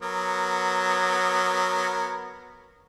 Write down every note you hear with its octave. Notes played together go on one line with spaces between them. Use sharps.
F#3 B3 A#4